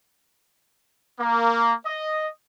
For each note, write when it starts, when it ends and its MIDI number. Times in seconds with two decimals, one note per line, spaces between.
1.20 1.74 58
1.86 2.29 75